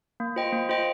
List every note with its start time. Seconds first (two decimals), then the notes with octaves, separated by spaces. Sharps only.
0.20 A#3
0.36 F4 C5 D#5 G5
0.53 A#3
0.69 F4 C5 D#5 G5